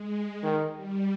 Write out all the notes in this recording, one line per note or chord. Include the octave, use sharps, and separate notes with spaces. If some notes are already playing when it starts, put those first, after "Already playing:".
Already playing: G#3
D#3
G3